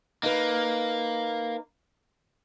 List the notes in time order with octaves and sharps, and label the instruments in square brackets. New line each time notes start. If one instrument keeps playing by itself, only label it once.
[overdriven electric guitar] A#3 [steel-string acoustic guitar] D#4 B4